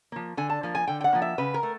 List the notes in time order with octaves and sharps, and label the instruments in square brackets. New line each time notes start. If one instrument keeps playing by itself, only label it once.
[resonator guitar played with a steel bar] F3 A#3
D3 G#5
A5
F3 A#3
G#5
D3 G5
G5
F#5
F3 A#3
E5
C#3 B4
A#4
A3